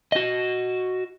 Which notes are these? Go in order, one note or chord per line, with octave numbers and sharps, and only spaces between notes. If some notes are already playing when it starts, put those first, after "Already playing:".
F#4 D#5